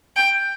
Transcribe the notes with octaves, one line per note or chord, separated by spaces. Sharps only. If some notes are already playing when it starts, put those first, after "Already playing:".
G5